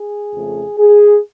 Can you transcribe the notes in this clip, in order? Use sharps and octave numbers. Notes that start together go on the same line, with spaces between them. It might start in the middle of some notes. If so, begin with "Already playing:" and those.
Already playing: G#4
F2 C#3 F3 A3
G#4